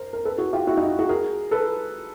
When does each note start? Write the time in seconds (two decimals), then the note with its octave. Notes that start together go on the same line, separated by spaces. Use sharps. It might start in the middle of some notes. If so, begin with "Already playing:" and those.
Already playing: A#4 C5
0.13 A#4
0.25 A4 B4
0.38 F#4 G#4
0.53 F4 G4
0.67 E4 F#4
0.77 D#4 F4
0.99 F#4 G#4
1.09 G#4 A#4
1.51 A4 B4